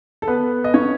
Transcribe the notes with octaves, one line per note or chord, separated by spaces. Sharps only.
A4
B3 B4
D#5
C#4 C#5